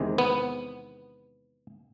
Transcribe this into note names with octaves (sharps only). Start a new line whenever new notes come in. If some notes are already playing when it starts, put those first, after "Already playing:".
Already playing: E2 C3 D#3 G#3
B3